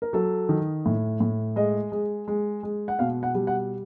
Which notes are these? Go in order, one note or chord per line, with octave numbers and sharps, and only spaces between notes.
A#4
F#3 A4
D#3
A2
A2
G#3 D#5
G#3
G#3
G#3
F#5
B2 F5
F#5
G3
F#5